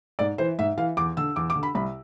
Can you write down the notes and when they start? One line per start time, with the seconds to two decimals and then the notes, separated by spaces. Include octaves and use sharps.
0.19 G#2 D5
0.38 E3 C5
0.59 G#2 E5
0.78 E3 F5
0.97 E2 D6
1.17 D3 E6
1.36 E2 D6
1.50 D6
1.56 D3
1.63 B5
1.75 C2 B5